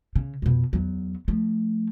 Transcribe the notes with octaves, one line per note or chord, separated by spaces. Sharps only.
C#3
F2 B2
E2 F#3
F3 A3